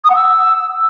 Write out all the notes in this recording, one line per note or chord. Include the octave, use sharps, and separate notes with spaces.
D#6
F#5
E6